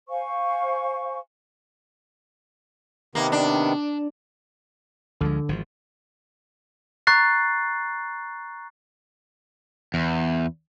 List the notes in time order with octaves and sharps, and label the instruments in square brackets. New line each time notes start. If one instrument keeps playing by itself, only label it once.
[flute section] C5 F5 G#5 C#6
[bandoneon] C3 D#3 B3 [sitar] A#3
[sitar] D4
[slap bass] D2 F3 G#3 [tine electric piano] D3
[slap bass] G#1 F3
[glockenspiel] A#5 C#6 F#6 A6 C7
[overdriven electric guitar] E2